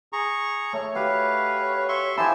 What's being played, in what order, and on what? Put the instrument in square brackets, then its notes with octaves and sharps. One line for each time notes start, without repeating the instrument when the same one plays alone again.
[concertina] G#4 A#5 C#6
[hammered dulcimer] A3 [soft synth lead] C#5
[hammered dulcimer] F#4 G4 [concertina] B4 F5
[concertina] E5 C6 C#6
[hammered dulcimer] F3 E4 [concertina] G4 A5 E6 [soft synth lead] G#5